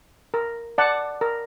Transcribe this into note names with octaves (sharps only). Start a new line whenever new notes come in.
A#4
D5 F#5 A5
A#4